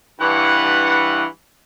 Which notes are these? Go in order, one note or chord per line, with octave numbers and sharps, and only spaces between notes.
G2 E3 F#5